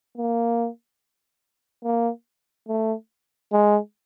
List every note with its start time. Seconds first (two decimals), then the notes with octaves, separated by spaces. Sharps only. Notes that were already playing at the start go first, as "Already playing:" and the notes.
0.18 A#3
1.84 A#3
2.68 A3
3.52 G#3